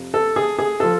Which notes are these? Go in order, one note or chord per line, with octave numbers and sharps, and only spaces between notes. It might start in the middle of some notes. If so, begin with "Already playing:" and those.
Already playing: F2 C3
A4
G#4
G#4
F3 A4